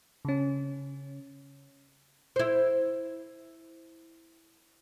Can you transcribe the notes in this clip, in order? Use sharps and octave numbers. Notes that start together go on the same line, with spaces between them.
C#3 C#4
E4 C5